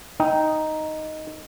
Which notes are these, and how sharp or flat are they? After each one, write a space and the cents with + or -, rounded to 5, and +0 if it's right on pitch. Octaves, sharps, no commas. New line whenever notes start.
D#4 +0 G5 -5